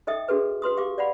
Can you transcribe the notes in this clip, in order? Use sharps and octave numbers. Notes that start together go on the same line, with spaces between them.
D#4 A4 D#5 E5 G5 D#6
D4 F#4 G#4 A4 B4
F#4 B4 C6 D#6
G4 F5 D6
D5 F5 F#5 B5